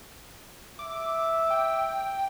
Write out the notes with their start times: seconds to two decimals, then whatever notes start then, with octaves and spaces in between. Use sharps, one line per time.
0.79 E5 D6
1.50 G5